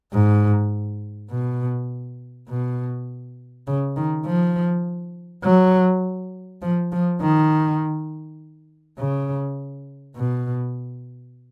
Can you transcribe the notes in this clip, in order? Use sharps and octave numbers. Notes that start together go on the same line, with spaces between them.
G#2
B2
B2
C#3
D#3
F3
F#3
F3
F3
D#3
C#3
B2